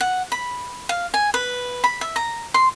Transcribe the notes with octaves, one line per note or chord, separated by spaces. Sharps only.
F#5
B5
F5
G#5
B4
B5
E5
A#5
C6